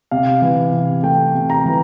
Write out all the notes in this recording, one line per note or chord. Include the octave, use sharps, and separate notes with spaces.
C3 F5
E3
C3
A3 G5
C3
A#5
E3